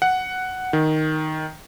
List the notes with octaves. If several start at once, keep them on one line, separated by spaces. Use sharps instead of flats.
F#5
D#3